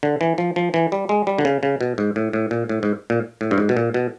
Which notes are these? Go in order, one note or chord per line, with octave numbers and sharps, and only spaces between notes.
D3
E3
F3
F3
E3
G3
G#3
G3
D3
C#3
C#3
B2
G#2
A2
A2
A#2
A2
G#2
A#2
A2
G2
G#2
B2
A#2
B2